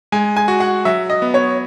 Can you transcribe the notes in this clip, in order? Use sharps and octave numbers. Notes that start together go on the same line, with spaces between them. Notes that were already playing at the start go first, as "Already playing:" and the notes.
G#3 G#5
G#5
F#4
F#5
F#3 E5
D#5
B3
C#5